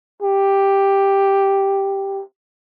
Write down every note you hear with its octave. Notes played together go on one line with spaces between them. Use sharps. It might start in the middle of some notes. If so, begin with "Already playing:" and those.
G4